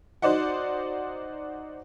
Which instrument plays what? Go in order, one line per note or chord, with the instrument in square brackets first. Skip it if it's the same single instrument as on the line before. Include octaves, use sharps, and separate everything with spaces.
[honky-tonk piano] D#4 F#4 C5 D5 D#5 F#5